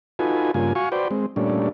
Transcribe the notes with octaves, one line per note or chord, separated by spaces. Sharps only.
D#4 F4 F#4 A4 B4 G#5
G2 C#3 A#3 F4 G#5
F#4 F5 G#5 C#6
F#4 B4 C5 D5 G5
G#3 C4
A#2 G3 A3 C#4 D4